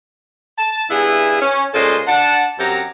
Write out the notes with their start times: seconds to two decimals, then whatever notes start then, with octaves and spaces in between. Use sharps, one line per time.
0.58 A5
0.90 G2 B3 E4 G#4 E5 G#5
1.42 C#4
1.74 A#2 G#3 C#4 A4 C5 D#5
2.07 D4 F#5 A5
2.59 F#2 C4 G4 F#5 A#5